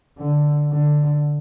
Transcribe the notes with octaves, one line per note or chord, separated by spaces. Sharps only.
D3
D3